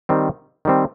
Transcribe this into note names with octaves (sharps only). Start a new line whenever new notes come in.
D#3 G3 C4
D#3 G3 C4